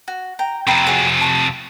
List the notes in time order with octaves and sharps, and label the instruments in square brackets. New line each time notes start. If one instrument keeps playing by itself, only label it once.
[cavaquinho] F#4
G5 A#5
[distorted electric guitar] F2 C3 [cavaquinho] G5 A#5 B5
[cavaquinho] F#4 G#4 C#5
A5 C#6